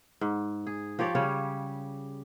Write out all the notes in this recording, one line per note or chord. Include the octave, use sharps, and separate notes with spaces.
G#2
G#4
F3 G4 C#5 D5
C#3 G3 C#5